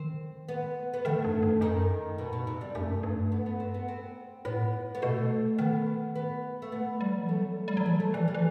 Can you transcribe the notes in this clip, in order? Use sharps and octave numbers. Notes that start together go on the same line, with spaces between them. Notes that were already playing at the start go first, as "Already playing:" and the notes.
Already playing: D#3 C4
B3
B3
D#3 A3
G2
G2
F#2 D#3
B2
B2
C3
G3
F#2 A3
G2
B3
B3
C4
B3
C4
A2 B3
B3
B2 A3
D#3 B3
B3
A3
B3
G3
F#3
E3
A3
F#3
G3
F#3
E3 A3
A3
E3 G3
G3
E3